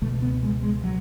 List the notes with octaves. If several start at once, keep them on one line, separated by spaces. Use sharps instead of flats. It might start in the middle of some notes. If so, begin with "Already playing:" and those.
C#2 B2 A3
B3
G#3
G#3
F#3